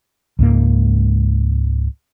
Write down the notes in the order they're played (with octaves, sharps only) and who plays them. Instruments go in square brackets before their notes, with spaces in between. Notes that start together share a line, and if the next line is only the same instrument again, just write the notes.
[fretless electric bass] C#2 G#2 A#3